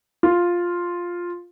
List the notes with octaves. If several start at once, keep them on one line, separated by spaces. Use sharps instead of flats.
F4